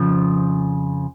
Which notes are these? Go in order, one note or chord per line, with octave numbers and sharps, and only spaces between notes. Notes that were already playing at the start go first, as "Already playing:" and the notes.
Already playing: F2 C#3 F3